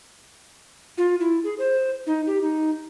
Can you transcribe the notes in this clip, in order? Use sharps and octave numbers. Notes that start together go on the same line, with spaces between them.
F4
E4
G#4
C5
D#4
G4
D#4